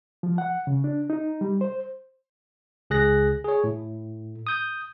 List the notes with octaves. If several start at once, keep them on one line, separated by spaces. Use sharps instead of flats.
F3
F#5
C#3
D4
D#4
G3
C5
C#2 G#4 F#6 A#6
G#4 C#5
A2
D#6 G6